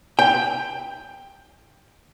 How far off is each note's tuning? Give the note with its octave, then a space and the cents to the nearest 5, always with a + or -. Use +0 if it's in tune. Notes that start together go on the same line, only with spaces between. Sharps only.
G5 +10